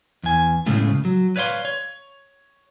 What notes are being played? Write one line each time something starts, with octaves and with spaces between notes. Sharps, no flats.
E2 G#5
A2 C#3 G#3 A3 F4
F#3
B4 C#5 D5 F5 C6
C#5